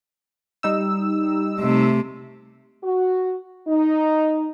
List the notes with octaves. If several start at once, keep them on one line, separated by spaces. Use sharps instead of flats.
G3 D#4 E6
C3 A3
F#4
D#4